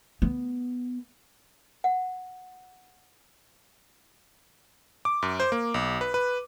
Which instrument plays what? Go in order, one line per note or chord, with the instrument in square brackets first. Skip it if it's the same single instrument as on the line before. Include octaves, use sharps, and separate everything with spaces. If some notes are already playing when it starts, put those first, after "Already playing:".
[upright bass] B3
[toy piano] F#5
[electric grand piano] D6
F#2
C5
A#3
B1
B4
B4